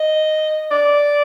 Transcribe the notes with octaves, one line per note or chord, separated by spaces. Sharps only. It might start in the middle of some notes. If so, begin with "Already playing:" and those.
Already playing: D#5
D5